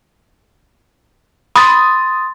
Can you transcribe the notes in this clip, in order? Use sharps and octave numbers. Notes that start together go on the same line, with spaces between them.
B5 C6 D#6 A6